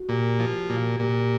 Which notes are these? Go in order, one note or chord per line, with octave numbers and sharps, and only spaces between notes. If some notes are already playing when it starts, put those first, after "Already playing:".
Already playing: F#4
A#2 G4
F3
A#2
A#2 G4